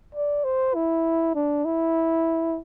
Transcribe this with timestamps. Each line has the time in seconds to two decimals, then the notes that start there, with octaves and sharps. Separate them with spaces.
0.15 D5
0.45 C5
0.75 E4
1.35 D4
1.65 E4